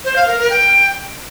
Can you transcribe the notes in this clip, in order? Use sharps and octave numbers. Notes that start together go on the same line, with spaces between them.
C5
F5
A#4
A#4
G5